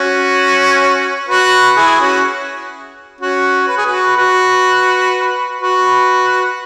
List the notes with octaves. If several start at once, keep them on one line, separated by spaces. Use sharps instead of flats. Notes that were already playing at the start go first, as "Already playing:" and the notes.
Already playing: C#4 F#4
F#4 B4
E4 G#4
C#4 F#4
C#4 F#4
B4
G#4
F#4 B4
F#4 B4
F#4 B4